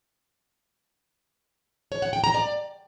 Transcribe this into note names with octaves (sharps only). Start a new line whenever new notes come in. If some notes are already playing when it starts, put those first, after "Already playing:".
C#5
F#5
G5
A#5
D5